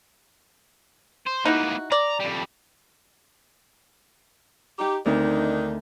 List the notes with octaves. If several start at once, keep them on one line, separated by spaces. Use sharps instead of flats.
C5
A#3 B3 D#4 E4 F#4
D5 A#5
F2 G3
D#4 G4
D2 D#3 C4 D4 D#4 A#4